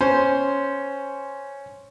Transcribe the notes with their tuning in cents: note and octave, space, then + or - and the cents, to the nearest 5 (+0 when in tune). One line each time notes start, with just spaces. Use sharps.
C#4 +0 C5 +0